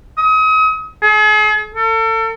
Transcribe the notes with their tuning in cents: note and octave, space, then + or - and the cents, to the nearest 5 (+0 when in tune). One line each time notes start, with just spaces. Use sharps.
D#6 +35
G#4 +40
A4 +40